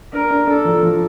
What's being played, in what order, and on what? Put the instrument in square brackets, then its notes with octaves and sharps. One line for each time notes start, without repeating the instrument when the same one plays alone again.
[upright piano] D4 [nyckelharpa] A#4
[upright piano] D4
[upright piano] D4 [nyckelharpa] A4
[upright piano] F3
F3